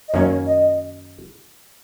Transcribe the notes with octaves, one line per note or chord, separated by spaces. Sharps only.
D#5
F#2 D#3 A#3 C#4 C#5
D#5